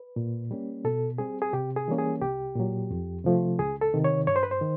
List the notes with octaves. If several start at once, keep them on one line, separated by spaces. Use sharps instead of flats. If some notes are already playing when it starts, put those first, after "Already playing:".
Already playing: B4
A#2
G3 A#3 C#4
B2 A4
G3 C4 G#4
G#4
C3 G4
G#4
E3 G3 A#3 C#4
G#4
C2 G4
A#2 F#3
F2
C3 F3 A3
C#2 G#4
A4
C3 D#3
C#5
G2 C#5
C5
B4
C5
D#3